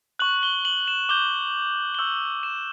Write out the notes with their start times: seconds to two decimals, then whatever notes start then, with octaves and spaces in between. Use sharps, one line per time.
0.19 C#6 F#6 F#7
0.43 G7
0.65 F#7
0.88 E7
1.09 D6 G6 G7
1.95 G7
1.99 C#6 E6 G6 F#7
2.43 E7